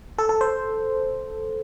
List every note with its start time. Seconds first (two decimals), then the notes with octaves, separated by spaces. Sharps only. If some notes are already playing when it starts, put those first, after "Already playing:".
0.18 A4
0.29 A4
0.41 C5